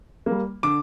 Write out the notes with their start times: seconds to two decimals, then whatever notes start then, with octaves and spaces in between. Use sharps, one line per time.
0.26 G3 A#3
0.63 D3 D6